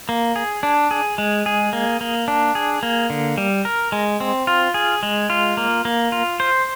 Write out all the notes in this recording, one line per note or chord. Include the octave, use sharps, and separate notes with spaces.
A#3
G#4
D4
G#4
G#3
G#4
A#3
A#3
D4
G#4
A#3
D3
G3
A#4
G#3
C4
F4
G#4
G#3
F4
A#3
A#3
F4
C5